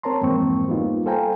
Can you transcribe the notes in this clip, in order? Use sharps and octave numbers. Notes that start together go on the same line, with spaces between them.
C4 A#4 C#5 A5 A#5 C6
F2 G#2 E3 A#3 C4 C#6
G3 A#3 B3 D#4 F4
A4 C5 F5 G5 G#5 A#5